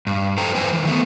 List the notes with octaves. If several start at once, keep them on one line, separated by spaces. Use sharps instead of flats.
G2
A4 C5 G5 A#5
F2 E3 B4 C5 G#5
D#3 E3
A3 B3